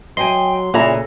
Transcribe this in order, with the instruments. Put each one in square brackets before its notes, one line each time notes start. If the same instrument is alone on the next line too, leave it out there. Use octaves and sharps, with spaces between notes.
[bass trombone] F#3 [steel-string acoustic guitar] D#5 G5 G#5 [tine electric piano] C6
[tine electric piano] A#2 [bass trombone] C#3 [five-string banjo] E3 G#4 A#5 [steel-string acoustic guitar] A4